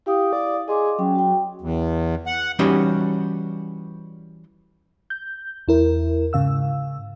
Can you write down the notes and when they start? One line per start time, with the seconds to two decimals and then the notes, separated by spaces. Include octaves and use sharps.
0.06 E4 G4 F5 D#6
0.33 D5
0.68 G#4 D#5 C6 D6
0.99 F#3 C#4 G5
1.15 F#4 G5
1.61 E2
2.26 F#5
2.59 E3 G3 C#4 D#4 F#4 C5
5.10 G6
5.68 E2 E4 A#4
6.33 G#2 C#3 F5 E6